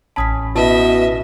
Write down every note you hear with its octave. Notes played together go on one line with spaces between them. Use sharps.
A1 C#4 A5 B5 D#6 B6
B2 E4 B4 D#5 E5 A5